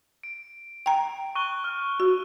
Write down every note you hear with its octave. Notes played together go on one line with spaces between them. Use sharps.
D7
G5 A#5
C#6 F#6 G7
F6
F#4